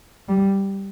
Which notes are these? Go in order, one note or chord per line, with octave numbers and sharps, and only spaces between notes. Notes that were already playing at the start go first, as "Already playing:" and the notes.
G3